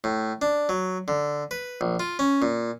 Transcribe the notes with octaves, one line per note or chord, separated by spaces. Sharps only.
A2
D4
F#3
D3
B4
A#1
F4
C#4
A#2